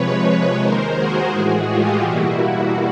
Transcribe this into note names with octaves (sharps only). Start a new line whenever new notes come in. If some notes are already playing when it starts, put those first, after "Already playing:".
Already playing: C3 F3 G#3 B4 C#5
D#2 D#3 G#3 A#4 C5
F#4 G#4
A2 E3 G#3
F4 G4
E2 B2 G3 A#3 E4 F#4